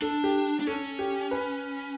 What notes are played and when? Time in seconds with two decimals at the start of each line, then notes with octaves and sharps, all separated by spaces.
0.02 D4 A4
0.24 G4
0.60 D4
0.67 C#4 A4
0.99 G4
1.31 B4